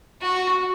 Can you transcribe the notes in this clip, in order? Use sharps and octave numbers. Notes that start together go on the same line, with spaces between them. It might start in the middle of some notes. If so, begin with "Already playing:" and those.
F#4